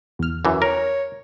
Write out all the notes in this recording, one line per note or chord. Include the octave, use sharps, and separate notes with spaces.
E2 F6
F#2 E3
A#4 C#5